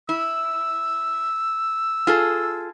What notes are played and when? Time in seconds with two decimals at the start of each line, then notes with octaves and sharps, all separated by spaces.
0.09 E4 E6
2.07 F4 G#4 A4